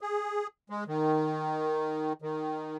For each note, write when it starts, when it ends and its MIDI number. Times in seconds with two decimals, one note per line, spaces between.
0.01 0.47 68
0.70 0.84 56
0.88 2.13 51
2.22 2.77 51